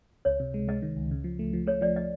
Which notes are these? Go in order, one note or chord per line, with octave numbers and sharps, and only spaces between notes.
C#2 C#5
C3
G#3
G#3 D#5
D#3
C#2
C#3
F3
A3
F3
A3 C#5
F3 D5
D#5